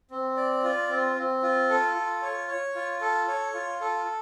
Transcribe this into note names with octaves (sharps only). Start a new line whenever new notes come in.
C4
D5
F4
C4
C4
F4
A4
F4
C#5
C#5
F4
A4
C#5
F4
A4